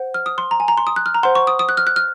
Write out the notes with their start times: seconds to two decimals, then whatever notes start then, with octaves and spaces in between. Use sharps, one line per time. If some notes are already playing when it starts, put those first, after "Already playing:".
Already playing: C5 F#5
0.14 F6
0.26 D#6
0.38 C6
0.51 A#5
0.60 G#5
0.68 A#5
0.77 C6
0.87 D#6
0.96 F#6
1.06 F6
1.15 A#5
1.23 C5 F#5 C6
1.35 C#6
1.47 D#6
1.59 D#6
1.69 F#6
1.77 F6
1.87 F#6
1.96 F6